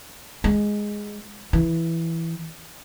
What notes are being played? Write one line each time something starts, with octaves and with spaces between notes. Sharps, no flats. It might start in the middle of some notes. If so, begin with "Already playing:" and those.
G#3
E3